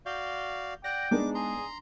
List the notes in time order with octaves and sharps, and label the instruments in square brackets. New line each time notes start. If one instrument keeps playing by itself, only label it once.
[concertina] F#4 D5 F5 [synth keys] G6
[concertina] D5 F#5 [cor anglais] G5 [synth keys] A#6
[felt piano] G#3 B3 B4 [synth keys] D4 D#4 [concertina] D6
[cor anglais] G#4 [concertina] A#5 C6